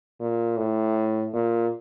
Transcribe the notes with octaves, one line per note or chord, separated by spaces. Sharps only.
A#2
A2
A#2